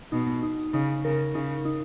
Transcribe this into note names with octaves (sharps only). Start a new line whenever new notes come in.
B2 D#4
D#4
C#3 D#4
C#3 A#4
C#3 D#4
D#4